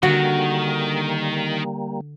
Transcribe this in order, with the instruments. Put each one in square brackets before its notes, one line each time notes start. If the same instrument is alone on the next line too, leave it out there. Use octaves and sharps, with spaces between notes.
[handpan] D3 [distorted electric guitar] D#3 [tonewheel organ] G3 A#3 [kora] F#4